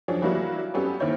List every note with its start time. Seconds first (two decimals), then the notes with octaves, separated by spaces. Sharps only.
0.08 F3 F#3 D4 G#4 C#5
0.22 E3 F#3 G3 A#3 E4 F#4
0.74 F#3 G3 B3 C#4 G4 A4
1.00 D#2 D#3 C4 E4 C#5 G6